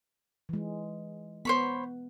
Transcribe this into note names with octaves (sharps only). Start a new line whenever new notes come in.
E3 G#3
B3 C5 C#5 B5